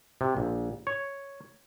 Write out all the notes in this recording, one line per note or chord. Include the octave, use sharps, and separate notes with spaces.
C3
A#1
C#5